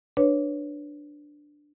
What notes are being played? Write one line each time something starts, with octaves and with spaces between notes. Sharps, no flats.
D4 B4 C#5